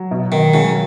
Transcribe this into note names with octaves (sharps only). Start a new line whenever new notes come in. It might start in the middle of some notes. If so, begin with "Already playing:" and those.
Already playing: F#3
B2
B2 D#3
C#3 F#3